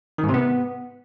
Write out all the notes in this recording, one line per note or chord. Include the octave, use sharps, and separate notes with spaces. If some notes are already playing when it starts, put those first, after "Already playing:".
D#3
G#2
C3
B3